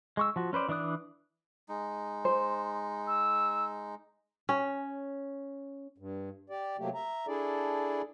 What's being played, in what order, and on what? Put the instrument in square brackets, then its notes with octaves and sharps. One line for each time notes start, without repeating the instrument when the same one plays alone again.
[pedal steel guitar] G#3 C#6 E6
F3 F#4
C#4 B4 C5 D5
E3 D4 D5 D#6 F#6
[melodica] G#3 D#4
[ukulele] C5
[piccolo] E6
[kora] C#4
[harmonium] G2
G4 D5
C3 F#3 A3 A#3 G4
E5 A#5
D4 E4 G#4 A4 D5